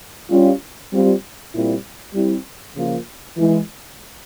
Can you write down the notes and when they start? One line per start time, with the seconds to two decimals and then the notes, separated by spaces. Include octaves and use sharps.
0.30 G3 C#4 F4
0.91 G3 C4 F4
1.52 A#2 G3 C4 E4
2.14 G3 C4 E4
2.75 C#3 F3 A#3 F4
3.36 E3 G#3 E4